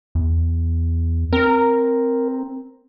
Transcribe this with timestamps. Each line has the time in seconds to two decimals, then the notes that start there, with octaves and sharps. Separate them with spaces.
0.15 E2
1.33 C4 A#4